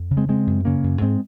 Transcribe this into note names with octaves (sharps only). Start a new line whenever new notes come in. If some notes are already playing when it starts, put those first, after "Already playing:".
Already playing: F2
C#3
G#3 C4
C#3 G#3 C4
F#2
C#3 A#3 C#4
F#2
G#2 G#3 C4